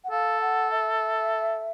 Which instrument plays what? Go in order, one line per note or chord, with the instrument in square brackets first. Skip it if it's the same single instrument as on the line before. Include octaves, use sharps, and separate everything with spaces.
[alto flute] F#5
[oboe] A4 [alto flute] F5
[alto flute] F#5
E5